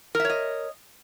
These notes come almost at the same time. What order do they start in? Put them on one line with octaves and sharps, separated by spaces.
A#4 E5 C#5 D#5